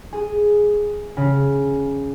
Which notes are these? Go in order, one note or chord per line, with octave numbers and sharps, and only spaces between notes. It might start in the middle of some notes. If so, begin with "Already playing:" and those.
G#4
C#3